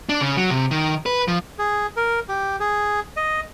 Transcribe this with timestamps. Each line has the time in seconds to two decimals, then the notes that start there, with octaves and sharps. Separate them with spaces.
0.09 D4
0.21 C#3
0.37 F#3
0.50 C3
0.71 D#3
1.06 B4
1.28 F3
1.59 G#4
1.97 A#4
2.29 G4
2.60 G#4
3.17 D#5